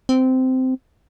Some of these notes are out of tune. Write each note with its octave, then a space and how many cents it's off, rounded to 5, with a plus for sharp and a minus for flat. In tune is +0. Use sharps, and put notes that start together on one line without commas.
C4 -15